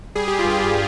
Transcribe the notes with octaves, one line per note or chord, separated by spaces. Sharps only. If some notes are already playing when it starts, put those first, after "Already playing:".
G3 G#4
G4
F4
G2
G4
G4